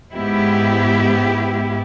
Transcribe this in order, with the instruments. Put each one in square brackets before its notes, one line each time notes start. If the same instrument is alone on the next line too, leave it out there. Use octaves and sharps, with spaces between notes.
[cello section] G#2 B3 E4 G4